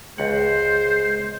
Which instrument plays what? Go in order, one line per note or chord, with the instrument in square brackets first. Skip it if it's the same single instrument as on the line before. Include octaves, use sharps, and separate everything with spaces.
[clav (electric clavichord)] C#2 F#5 [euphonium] G#3 [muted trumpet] C5